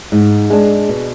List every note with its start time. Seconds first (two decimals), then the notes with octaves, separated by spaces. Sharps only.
0.12 G#2
0.50 G#3 D4
0.89 B2